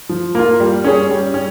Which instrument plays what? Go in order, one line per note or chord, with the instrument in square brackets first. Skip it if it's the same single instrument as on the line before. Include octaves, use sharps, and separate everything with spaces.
[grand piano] F3
A#3 F4
G3
C#4 G#4 C#5
G3
C#4